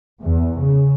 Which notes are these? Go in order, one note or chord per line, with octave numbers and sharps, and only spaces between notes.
E2
C#3